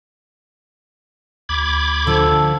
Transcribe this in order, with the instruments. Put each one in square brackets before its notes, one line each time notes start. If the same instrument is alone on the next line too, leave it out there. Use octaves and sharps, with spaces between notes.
[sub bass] D2 [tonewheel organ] B5 D6 G#6
[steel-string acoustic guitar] D3 F3 [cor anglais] A4